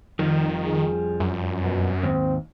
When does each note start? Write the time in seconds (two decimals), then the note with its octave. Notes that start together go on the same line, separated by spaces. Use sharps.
0.19 F2 D#3 F3 G3
0.65 G#4
1.20 F#2
1.62 B2
2.03 D#2 G#2 C4